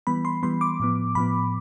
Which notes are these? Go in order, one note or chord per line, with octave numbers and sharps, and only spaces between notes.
E3 G3 B3 B5
C6
E3 G3 B3 C6
D6
A2 F3 B3
A2 F3 B3 B5